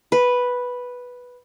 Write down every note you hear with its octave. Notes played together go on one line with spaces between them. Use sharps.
B4